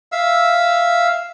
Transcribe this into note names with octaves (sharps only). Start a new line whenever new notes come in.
E5 F5 E6